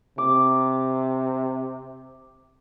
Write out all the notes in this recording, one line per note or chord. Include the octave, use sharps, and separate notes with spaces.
C3 D6